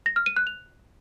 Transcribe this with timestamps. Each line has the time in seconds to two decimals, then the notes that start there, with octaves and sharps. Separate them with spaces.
0.06 A#6
0.16 F6
0.26 D#7
0.36 F#6
0.47 F7